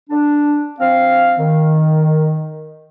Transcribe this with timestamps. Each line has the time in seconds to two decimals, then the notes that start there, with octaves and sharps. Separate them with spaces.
0.10 D4
0.80 F3 C4 F5
1.39 D#3